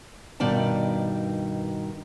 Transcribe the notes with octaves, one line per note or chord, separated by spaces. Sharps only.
G2 B2 D#3 D5 A5